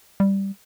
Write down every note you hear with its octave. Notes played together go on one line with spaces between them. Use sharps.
G3